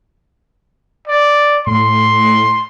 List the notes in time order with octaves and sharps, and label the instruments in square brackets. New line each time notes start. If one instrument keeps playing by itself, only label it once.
[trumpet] D5
[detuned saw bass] A2 [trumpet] C6